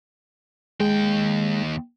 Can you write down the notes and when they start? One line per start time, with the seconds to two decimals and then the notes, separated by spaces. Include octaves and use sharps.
0.80 D#2 G#3 G5